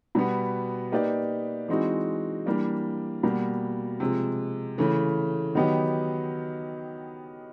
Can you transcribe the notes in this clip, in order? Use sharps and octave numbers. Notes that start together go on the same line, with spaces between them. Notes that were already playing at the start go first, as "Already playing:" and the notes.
B2 G3 B3
A#3 D#4 G4 B4 D5
E3 G#3 C4 D#4 F#4
E3 G3 A#3 D4
B2 G3 A#3
C3 F3 G#3
C#3 E3 A3
D#3 F#3 B3 D#4 G4